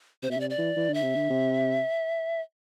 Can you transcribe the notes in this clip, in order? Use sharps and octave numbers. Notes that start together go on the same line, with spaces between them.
C3 C5
B2 E5
C3 D5
D5
E3
E3
D3
E5
C3
D3
C3